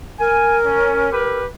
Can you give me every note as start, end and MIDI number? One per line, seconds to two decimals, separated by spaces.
0.20 1.39 70
0.20 0.58 80
0.66 1.12 61
1.12 1.47 67
1.12 1.47 71